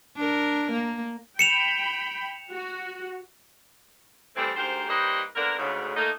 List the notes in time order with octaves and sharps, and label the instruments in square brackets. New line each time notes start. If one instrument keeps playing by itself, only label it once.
[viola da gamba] D4 A#4
A#3
[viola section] G5 B5 [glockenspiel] C#7 E7 F7
[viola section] F#4
[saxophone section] E3 G3 A3 C4
D2 G#2 G4 A#4 C5
G3 A#3 D#4 B4 C5 D#5
D3 A#3 B3 D4 A#4
D2 G#2 C#3
A3 A#3 D#4